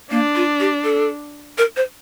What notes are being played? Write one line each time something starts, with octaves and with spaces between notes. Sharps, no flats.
A#3 D4
F4
G4
A4
A#4
C5